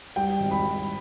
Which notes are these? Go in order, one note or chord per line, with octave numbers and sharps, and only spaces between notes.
G3 G5
G#1
B5
G3